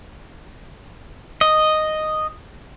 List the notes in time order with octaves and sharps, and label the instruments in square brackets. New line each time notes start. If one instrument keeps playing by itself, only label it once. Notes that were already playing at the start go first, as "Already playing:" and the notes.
[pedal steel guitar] D#5